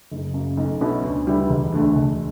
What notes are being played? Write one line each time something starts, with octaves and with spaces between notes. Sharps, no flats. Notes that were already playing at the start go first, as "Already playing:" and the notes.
F#1
F#2 C#3
B1
B2 F#3 C#4 E4
D2
D3 G3 B3 E4
E1
D2 D3 A3
E1